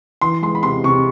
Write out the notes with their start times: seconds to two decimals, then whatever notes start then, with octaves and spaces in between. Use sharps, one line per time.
0.21 E3 C6
0.42 G#3 C6
0.55 B5
0.63 C3 C6
0.84 C3 C#6